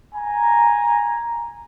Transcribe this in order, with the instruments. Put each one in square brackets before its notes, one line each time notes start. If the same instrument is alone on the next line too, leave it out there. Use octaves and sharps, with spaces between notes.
[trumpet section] G#5 A#5